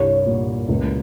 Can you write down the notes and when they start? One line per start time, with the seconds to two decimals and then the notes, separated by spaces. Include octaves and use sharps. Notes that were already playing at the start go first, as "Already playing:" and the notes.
Already playing: C2 G2 C#5
0.26 A#2
0.68 C#2